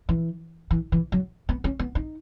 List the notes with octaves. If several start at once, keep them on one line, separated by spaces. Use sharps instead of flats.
E3
E3
E3
F#3
B3
C#4
B3
D#4